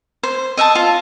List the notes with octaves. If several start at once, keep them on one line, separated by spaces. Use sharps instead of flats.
C5
D#5 E5 G5 A5
F4